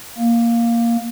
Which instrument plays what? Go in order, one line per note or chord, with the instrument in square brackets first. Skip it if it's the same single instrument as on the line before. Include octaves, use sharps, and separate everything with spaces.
[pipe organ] A#3